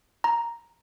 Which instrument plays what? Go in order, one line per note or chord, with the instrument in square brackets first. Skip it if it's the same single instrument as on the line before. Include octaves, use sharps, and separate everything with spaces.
[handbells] A#5